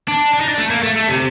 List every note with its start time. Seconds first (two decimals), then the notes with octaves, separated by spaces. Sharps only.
0.08 D4
0.34 D4
0.41 D#4
0.49 D4
0.58 A3
0.70 A#3
0.83 A3
0.96 A3
1.08 C3